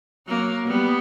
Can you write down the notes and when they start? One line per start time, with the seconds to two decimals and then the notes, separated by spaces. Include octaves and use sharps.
0.28 F#3 A#3
0.67 G3 B3